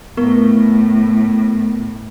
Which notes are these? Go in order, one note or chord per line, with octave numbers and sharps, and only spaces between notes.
A2 B3 A#4 C#6